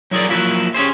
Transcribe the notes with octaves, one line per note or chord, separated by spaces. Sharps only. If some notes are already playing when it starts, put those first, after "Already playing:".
F#3 E4 G#4 A#4 D5
F3 F#3 A#3 E4 F#4
C#4 G4 G#4 C5